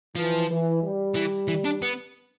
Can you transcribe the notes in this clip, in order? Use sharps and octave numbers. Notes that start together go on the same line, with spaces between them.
E3 F3
E3
G3
E3
E3
D4
B3